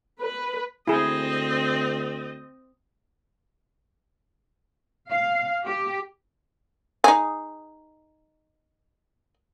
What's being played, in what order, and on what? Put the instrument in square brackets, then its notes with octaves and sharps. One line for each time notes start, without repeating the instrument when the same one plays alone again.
[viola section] B4
[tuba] D2 [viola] C4 D#5 [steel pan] E4 G#4
[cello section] F5
G4
[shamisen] D#4 G#4